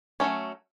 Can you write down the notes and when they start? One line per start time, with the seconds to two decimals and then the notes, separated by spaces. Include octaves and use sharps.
0.20 F#3 A3 C#4